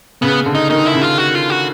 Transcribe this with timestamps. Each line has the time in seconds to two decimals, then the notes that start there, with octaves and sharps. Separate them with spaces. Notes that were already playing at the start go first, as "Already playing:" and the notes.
0.22 C#3 B3
0.46 D3
0.55 D#4
0.70 D#3 D#4
0.86 E4
0.94 C#3
1.02 F4
1.18 F#4
1.35 F4
1.50 F#4